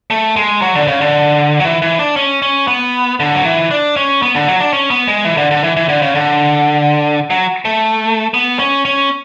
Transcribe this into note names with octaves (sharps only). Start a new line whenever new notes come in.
A3
G#3
F#3
D3
C#3
D3
F#3
E3
E3
D4
C#4
C#4
B3
D3
F#3
E3
D4
C#4
B3
D3
F#3
D4
C#4
B3
G#3
E3
D3
D3
E3
E3
D3
C#3
D3
F#3
A3
B3
C#4
C#4